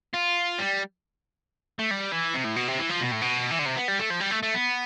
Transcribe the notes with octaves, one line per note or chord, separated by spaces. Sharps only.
F4
G3
A3
G3
E3
C3
A2
B2
C3
E3
F3
B2
A2
B2
E3
D3
C3
B3
G3
A3
F3
G3
A3
A3
B3